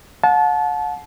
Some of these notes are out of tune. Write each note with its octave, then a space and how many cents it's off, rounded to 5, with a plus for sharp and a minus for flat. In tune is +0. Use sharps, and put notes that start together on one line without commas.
F#5 -40 A5 -25